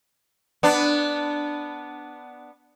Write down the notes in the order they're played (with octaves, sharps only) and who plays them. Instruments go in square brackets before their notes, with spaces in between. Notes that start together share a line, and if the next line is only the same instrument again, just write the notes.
[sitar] B3 D4